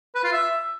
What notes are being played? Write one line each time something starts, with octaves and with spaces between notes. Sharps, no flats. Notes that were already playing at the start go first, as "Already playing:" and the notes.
B4
F4
E5